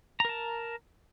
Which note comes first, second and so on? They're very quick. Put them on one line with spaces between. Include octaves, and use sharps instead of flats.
A#5 A#4 A5